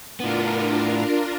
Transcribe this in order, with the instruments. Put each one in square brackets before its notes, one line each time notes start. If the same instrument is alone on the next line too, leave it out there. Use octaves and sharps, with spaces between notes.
[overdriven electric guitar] A2 B3 [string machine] D4 F4 A#4